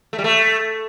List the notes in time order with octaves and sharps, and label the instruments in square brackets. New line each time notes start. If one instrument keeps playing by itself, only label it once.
[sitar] A3
G3
A3